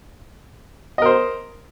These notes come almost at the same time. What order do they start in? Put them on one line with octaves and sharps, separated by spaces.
D#5 A#4 C5